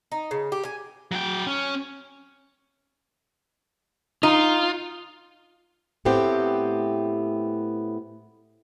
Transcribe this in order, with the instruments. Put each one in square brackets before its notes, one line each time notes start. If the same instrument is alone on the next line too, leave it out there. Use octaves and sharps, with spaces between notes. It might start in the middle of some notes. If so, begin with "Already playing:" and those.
[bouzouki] D#4
C#3
G4
G#5
[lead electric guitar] F#3 G5
C#4
[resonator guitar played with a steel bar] D#4 [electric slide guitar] F4
[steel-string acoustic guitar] A2 A3 B3 C4 G4